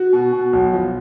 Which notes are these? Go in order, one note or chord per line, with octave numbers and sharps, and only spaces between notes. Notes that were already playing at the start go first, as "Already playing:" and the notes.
Already playing: F#4
B2
B2
B1
F3